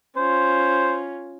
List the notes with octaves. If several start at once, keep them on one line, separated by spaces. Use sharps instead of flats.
C#4 F4 C5